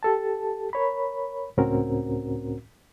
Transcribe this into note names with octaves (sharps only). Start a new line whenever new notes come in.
G4 A4 A5
A#4 C#5 B5
C#2 A2 C4 C#4 F#4 A#4